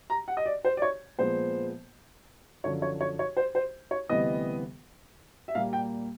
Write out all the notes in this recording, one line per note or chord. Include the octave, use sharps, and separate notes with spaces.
A#5
F#5
D#5
D5
C5
D5
C#5
A#2 F3 G#3 B3 C5
F#2 D3 F3 C#5
C#5
C#5
C#5
C5
C5
C#5
D2 C3 E3 G3 B3 D#5
E5
A#2 G3 A#3 F5
G5